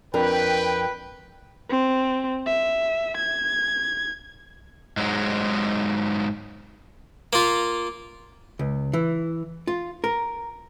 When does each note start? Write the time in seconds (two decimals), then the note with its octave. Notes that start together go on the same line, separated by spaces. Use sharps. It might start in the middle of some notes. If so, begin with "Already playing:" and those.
0.14 F2 D4 A#4 B4 G5
1.70 C4
2.47 E5
3.17 G#6
4.97 G#2 F#3 G#3
7.33 A#3 F4
8.59 C#2
8.93 E3
9.67 F4
10.04 A#4